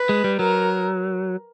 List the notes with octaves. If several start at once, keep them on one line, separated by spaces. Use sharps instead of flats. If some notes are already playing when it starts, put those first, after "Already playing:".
Already playing: B4
G#3
G3
F#3 A#4